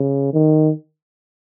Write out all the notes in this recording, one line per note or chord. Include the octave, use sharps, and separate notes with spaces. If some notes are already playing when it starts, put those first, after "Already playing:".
Already playing: C#3
D#3